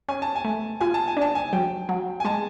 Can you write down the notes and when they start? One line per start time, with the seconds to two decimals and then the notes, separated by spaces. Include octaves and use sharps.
0.09 C#4 G#5
0.22 A5
0.36 G#5
0.45 A3
0.81 F4 G#5
0.94 A5
1.08 G#5
1.17 D4 A5
1.35 G#5
1.53 F#3 G5
1.89 F#3
2.20 G#5
2.25 G#3 A5